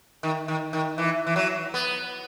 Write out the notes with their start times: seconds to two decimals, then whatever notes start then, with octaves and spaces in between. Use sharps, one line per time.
0.23 D#3
0.48 D#3
0.73 D#3
0.98 E3
1.27 E3
1.36 F#3
1.74 B3